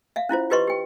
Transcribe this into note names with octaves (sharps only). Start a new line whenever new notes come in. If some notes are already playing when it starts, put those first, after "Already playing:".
E5 F5
C#4 E4 F4 C5
F4 G4 B4 D#5 C6 C#6
G4 G5